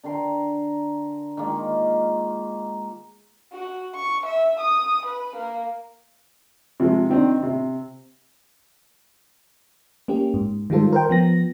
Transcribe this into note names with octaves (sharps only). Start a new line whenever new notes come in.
D3 A#4 G5 C6
D#3 G#3 A#3 F4
F#4
C#6
E5
D#6
B4
A#3
C3 F3 G#3
D#3 C4 D4 D#4
C3
A#3 C#4 G4
G#2
D#3 G3 G#3 F4 A4 C5
A#4 C5 G5
F3 B3 A#6